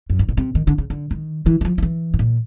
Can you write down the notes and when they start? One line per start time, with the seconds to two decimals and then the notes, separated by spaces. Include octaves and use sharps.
0.10 F#2
0.19 G2
0.29 B2
0.37 C3
0.55 D#3
0.67 D3
0.78 C#3
0.90 D3
1.11 D#3
1.46 E3
1.61 E3
1.65 F3
1.78 F3
1.83 E3
2.14 A2
2.19 A#2